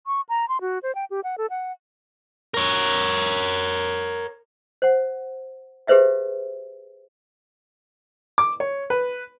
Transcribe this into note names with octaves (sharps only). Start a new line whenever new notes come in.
C#6
A#5
C6
F#4
C5
G5
G4
F#5
A4
F#5
A#4 C#5
C5 F#5
G4 G#4 B4 C5 E5 F5
D6
C#5
B4